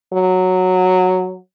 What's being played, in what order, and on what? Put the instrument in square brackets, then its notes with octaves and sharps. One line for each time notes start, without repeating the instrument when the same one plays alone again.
[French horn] F#3